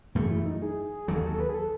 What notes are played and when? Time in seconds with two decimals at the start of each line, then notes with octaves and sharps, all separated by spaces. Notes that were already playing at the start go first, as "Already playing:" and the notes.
0.15 F#2 E3 A3 G#4
0.31 E4
0.45 D#4
0.62 G#4
0.85 G#4
1.08 D#2 D#3 F#3 A4
1.23 A4
1.40 B4
1.49 G#4
1.55 A4